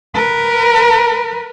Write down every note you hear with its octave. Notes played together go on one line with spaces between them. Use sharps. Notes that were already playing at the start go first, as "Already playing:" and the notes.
A#4 B4